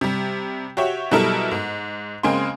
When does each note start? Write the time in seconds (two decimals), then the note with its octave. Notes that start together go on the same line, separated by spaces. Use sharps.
0.01 C3 G3
0.77 F#4 G4 C#5 E5
1.11 B2 F#3 G3 E4 A4 A#4
1.51 G#2
2.23 C#3 G#3 A#3 C4 G#5 C6